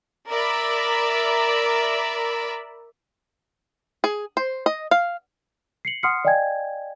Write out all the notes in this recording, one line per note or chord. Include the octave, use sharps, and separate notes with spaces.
A#4 D5 E5 B5
G#4
C5
D#5
F5
C7 C#7 F#7
F#5 C6 D#6 F6 C7 C#7
D5 D#5 F5 G5 G#5 G#6